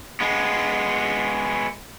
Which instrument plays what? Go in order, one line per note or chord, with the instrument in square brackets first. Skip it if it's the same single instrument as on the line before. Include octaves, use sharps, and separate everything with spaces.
[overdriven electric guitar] G#3 B3